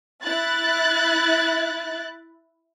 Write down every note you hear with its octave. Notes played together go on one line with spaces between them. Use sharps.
E4 F#6 A6